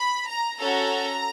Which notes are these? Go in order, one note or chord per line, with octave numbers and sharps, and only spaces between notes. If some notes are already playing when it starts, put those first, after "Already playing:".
Already playing: B5
A#5
C#4 F#4 A4 A#5